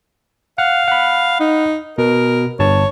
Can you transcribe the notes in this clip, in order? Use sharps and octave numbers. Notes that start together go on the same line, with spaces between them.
F5 F#5
F#5 B5
D#4
B2 A#4
G1 G2 C#5 A5